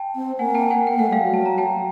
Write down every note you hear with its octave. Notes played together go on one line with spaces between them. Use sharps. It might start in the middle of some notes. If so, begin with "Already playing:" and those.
Already playing: G5 A5
C4
A#3 F#5 G#5
G5 A5
F#5 G#5
A#3 G5
A3 F#5
G3 F5 G5
F#3
A5
A#5
G5 A5